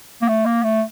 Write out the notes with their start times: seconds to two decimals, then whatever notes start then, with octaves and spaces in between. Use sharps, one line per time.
0.21 A#3
0.28 A3
0.45 A#3
0.63 A3